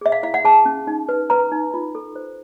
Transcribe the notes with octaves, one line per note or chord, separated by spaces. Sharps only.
G#4 E5
F5
E4 F5
F#5
G#4 A5
C#4
D#4
B4
B4 A#5
D#4
F4
A4
C5